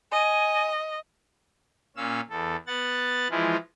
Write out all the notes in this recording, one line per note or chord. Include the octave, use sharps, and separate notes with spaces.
D#5 G#5
A#2 C#4 F5 E6
E2 A4
B3 F#5 A6
E3 F3 G#3 E4 F4